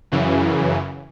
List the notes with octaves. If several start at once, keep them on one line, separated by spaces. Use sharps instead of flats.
F#2 C#3 E3